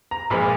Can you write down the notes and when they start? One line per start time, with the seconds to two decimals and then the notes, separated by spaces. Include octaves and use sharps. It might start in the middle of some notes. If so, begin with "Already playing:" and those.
0.11 A#5
0.30 A#1 A#2 F3 G#3 B5